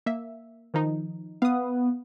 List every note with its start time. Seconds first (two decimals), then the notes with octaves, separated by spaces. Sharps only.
0.06 A#3 E5
0.74 D#3 F3 D#4
1.42 B3 F5 D#6